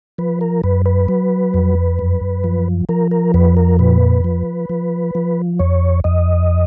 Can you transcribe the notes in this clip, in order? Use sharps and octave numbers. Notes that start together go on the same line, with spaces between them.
F3 B4
A#4
F#2 B4
B4
F#3
F2
F#2
F3
F3 A#4
A#4
F2 B4
A#4
A#2 B4
F3
F3
F3
F2 C#5
F2 D#5